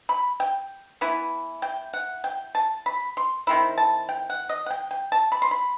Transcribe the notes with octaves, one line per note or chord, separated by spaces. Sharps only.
B5
G5
E3 B3 E4
G5
F#5
G5
A5
B5
C6
D#3 F#3 C4 E4 B5
A5
G5
F#5
D#5
F#5
G5
G5
A5
B5
C6
B5